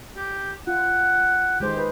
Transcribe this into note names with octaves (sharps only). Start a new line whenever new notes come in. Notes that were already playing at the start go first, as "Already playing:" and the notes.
G4
F4 F#5
D#3 G#3 G4 C5
B4